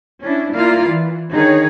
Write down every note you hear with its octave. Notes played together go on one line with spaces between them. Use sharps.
C#4 D4 E4
A#3 E4 F4 D5 F5
E3
D3 D#3 D#4 G#4 C#5